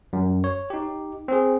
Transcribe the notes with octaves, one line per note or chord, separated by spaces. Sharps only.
F#2
C#5
D#4 G4
C4 G#4